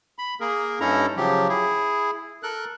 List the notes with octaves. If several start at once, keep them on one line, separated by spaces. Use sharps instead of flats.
B5
A#3 G#4 A#4
G2 C#4 D#4 E4 A4 A#5
C#3 F3 F#3 G4
E4 G#4
A4 A#4 F#6